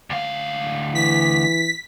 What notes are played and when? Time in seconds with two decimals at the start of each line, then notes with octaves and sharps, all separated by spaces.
0.10 D2 F5
0.95 E3 B6